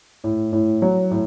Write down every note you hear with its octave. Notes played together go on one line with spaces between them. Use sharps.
A2
A2
F#3
A2